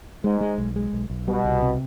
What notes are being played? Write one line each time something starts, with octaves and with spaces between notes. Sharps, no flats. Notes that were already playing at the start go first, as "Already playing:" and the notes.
G#2 G#3
G#3
B1
G#3
B1
B1
B2 G3
C2
C3